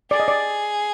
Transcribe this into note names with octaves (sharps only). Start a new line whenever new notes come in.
G#4 D5
D#5
D5